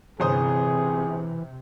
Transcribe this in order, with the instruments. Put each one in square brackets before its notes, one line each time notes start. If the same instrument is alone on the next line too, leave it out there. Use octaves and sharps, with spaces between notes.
[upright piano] G1 C5 D#6 [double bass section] C3 [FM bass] E3 [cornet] G#4